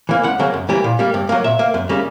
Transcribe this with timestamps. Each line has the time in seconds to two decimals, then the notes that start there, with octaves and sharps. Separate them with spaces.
0.09 E3 A#3
0.23 C#2 F#5
0.39 C#3 F#3 A#3
0.54 F#2
0.69 E3 G3 A#3
0.84 A#2
0.99 G3 A#3
1.14 G2
1.29 F#3 A#3
1.44 A#2 E5
1.59 A#3
1.74 F#2
1.89 C#3 G3 A#3